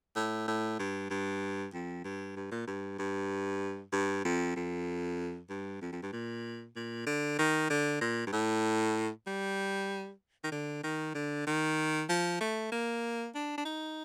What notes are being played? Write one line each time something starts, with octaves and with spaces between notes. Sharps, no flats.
A2
A2
G2
G2
F2
G2
G2
A#2
G2
G2
G2
F2
F2
G2
F2
F2
G2
A#2
A#2
D3
D#3
D3
A#2
G2
A2
G3
D#3
D3
D#3
D3
D#3
F3
A3
A#3
D4
D4
D#4